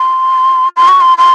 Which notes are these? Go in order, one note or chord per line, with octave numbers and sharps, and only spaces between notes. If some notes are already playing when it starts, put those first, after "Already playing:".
Already playing: C6
C6
C#6
C6
C6